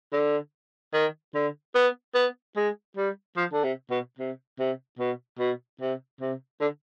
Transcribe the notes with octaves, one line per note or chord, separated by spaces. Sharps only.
D3
D#3
D3
B3
B3
G#3
G3
F3
D3
C3
B2
C3
C3
B2
B2
C3
C3
D3